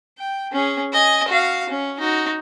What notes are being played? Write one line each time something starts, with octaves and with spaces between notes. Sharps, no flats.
G5
C#4 G#4
D#5 G#5
F#4 F5
C#4
D#4 F#4